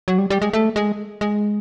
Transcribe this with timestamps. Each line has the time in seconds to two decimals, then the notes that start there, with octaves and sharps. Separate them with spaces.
0.08 F#3
0.18 G3
0.30 G3
0.42 G#3
0.53 A3
0.76 G#3
1.21 G#3